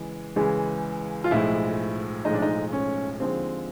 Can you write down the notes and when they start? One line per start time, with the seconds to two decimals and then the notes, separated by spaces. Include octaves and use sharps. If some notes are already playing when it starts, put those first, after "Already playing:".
Already playing: C#3 E3 G#3
0.36 C#2 C#3 E3 G#3
1.24 F4
1.31 B1 A2 F3 G#3 E4
2.25 B1 A2 F3 G#3 D#4
2.34 D4
2.42 D#4
2.72 C#4
3.19 D#2 D3 F3 G#3 C4